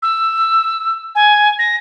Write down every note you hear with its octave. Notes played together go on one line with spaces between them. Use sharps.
E6
G#5
A#6